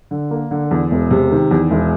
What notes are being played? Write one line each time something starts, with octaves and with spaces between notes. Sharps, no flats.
D3
A#3
D3
E2
E1
C3
D#3
E2
E1